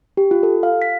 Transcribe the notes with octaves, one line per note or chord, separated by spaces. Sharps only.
G4
F4
A4
F5
B6